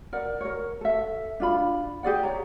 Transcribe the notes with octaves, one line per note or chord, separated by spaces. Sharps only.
A#4 D5 F#5
A#4 C#5
A4 E5
D4 F4 B5
G4 G#4 D5 F#5
C#5 A#5